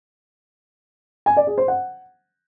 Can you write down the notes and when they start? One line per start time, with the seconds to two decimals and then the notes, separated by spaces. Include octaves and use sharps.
1.26 G#5
1.37 D5
1.47 G#4
1.58 C5
1.68 F#5